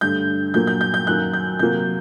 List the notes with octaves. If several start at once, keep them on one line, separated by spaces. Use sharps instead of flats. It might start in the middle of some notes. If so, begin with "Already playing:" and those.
G2 D3 A3 G6
A#2 F#3 A#3 G6
G6
G6
G6
F#2 D#3 F#3 A#3 F#6
G6
C3 F#3 A#3 G6